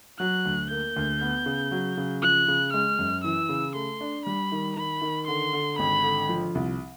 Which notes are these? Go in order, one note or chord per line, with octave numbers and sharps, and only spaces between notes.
F#3 F#6
D2
A#3 G6
D2
B3
C#3
F#3
C#3
F3 F#6
C#3
G#3 F6
F#2
E3 E6
C#3
A3 C6
D4
G3 B5
D#3
D#3 B5
D#3
D3 C6
D3
G#1 B5
D3
F3
C2